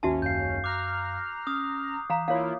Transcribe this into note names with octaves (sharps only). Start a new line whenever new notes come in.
G#1 D#2 C#4 F#4 E5 A5
F#2 F5 G6 C7
A#5 D6 F6 F#6
C#4 D#6
E3 F5 A#5
A#3 E4 F4 C#5 F5